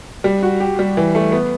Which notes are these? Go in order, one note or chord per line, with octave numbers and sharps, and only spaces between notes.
G3
F#4
G4
G3
E3
A3
B3